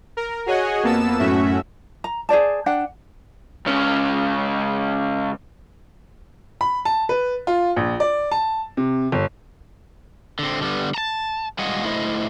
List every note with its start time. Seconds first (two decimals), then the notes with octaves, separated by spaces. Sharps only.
0.17 A#4
0.46 F#4 G#4 C#5 D#5 F#5 G#5
0.83 F2 A#3 B3 A5 E6 E7
1.19 F#2 A2 A3 C#4 F#4 E5
2.04 A#5
2.29 G#4 C5 D5 A5
2.66 D4 F#5 G5
3.66 C#2 C#4
6.61 B5
6.85 A5
7.09 B4
7.47 F4
7.76 A#1
8.00 D5
8.32 A5
8.77 C3
9.12 G1
10.39 D3 C4
10.61 D3 G3 B3
10.94 A5 A#5
11.59 G3 G#3 F4 G#4 D#5 F#5
11.84 A3 E4 C5 D#5